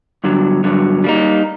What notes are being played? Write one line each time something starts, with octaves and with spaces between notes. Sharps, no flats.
G2 D3 F#3
G2 D3 F#3
G3 A#3 D#4